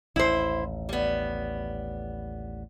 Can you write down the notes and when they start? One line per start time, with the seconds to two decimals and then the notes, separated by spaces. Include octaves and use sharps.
0.16 A1 D#2 E4 C5
0.89 G3 B3